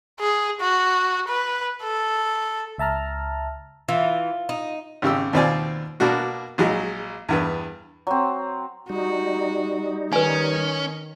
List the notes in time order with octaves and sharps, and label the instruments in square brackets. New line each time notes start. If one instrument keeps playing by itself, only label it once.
[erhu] G#4
F#4
B4
A4
[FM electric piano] C#2 E5 A5 A#5 F6
[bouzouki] E3 [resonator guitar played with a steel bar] F4
[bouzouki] D#4
[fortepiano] G#1 C#3 G4 E6
D#2 B2 C4 F4 D5 G#5
B2 A#3 D4 F#4
A#1 F#3 G#3
E2 G2 B3
[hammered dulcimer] F#3 C4
[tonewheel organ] G3 D#4 [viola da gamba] F#4
[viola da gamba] D#3 [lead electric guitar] C#4 [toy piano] B4 G#5